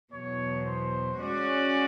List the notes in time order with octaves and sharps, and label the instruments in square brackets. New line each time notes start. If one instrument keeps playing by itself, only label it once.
[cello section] E2 B2 F#3 [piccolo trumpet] C#5
[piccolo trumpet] C5
[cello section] G#3 C#4 F#4 [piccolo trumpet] D5